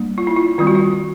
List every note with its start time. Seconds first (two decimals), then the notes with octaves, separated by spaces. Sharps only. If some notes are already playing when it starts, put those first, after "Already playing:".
Already playing: G3 A#3 D4
0.18 F4
0.27 E4
0.36 F4
0.58 D#3 G3 C4 F4
0.67 F#4
0.75 F4